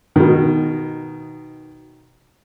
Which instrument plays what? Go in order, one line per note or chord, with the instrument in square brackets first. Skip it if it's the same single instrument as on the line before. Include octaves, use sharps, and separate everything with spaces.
[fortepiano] B2 D#3